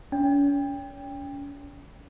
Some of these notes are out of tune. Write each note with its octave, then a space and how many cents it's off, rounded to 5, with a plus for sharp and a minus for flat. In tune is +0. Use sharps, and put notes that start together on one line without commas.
C#4 +40 G5 +25